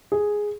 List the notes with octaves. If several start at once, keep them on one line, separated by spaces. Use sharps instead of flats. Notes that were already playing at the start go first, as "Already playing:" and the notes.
G#4